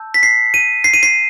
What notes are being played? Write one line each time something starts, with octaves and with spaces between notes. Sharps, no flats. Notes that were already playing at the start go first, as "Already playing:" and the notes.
Already playing: A5 E6 G6
B6
C7
D#7
C7
D#7
C7